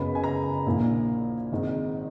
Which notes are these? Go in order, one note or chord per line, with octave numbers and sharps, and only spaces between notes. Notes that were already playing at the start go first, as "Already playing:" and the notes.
Already playing: F#1 F#2 C#3 G#3 B3 B5
G#5
A#5
A#1 A#2 A#3 E4
G#1 G#2 D#3